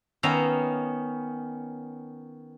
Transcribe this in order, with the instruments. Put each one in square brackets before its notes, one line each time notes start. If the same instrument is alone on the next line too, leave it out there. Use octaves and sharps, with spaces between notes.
[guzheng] D#3 B3 C#4 E5 F5 A#5